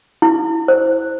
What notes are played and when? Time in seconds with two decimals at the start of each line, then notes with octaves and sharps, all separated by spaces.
0.22 E4
0.68 C5